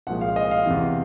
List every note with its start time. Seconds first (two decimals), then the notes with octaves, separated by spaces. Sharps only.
0.07 C2 A#2 F3 G#3 F#5
0.21 F5
0.36 D#5
0.51 F5
0.66 E2 C3 E3